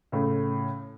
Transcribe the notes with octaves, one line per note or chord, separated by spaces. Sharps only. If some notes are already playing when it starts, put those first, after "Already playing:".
A2 C#3